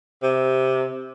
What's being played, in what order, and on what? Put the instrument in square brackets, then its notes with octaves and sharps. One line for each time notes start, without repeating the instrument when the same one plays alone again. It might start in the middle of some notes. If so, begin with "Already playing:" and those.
[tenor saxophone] C3